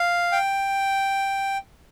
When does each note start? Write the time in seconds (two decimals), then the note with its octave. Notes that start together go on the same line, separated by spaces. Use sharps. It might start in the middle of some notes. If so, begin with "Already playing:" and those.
Already playing: F5
0.32 G5